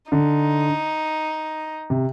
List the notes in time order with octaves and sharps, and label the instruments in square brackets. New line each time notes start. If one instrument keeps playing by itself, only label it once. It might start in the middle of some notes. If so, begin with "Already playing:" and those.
[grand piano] D3 [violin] D#4
[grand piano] C3